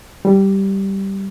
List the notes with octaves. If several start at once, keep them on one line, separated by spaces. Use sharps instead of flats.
G3